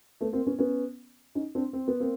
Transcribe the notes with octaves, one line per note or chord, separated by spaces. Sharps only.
A3 B3
A#3 C4
B3 C#4
B3 C#4
C#4 D#4
C4 D4
C4
B3
A#3 C4